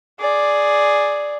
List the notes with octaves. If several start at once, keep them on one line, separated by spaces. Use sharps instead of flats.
G#4 D5